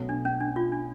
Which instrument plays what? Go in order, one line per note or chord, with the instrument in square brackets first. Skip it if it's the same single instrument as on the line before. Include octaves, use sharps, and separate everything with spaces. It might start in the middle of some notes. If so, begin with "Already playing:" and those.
Already playing: [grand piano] B1 B2 A3 C#4
[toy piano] D4
C#4
D4
F4
D4